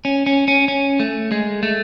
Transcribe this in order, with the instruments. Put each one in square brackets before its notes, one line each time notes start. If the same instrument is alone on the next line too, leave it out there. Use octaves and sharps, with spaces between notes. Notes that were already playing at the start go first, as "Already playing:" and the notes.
[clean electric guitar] C#4
C#4
C#4
C#4
A3
G#3
A3